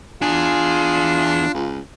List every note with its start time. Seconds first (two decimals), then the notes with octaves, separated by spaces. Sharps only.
0.22 E2 D4 F4 G#4
1.54 C#2